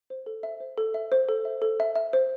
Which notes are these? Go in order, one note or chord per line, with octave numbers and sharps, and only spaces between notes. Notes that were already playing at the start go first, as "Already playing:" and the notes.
C5
A4
E5
C5
A4
E5
C5
A4
E5
A4
E5
E5
C5